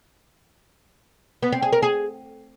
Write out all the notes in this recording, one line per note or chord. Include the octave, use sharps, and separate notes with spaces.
B3
C4
G#4
A#4
G#4